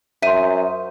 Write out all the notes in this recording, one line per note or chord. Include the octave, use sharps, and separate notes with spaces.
F#2 D#4 C5 E5 D#7